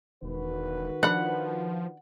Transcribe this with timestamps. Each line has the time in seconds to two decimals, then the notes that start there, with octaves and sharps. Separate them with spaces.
0.23 E1 D#3 F#4 B4
1.03 F3 D4 F#5 B5